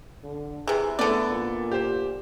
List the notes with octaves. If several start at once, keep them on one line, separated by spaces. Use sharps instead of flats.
D3
C3 E3 G#4
D3 A3 B3 E4 A4 D5
A#2
G4 C5